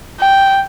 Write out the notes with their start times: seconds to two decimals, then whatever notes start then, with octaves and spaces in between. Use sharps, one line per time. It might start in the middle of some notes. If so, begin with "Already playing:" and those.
0.20 G5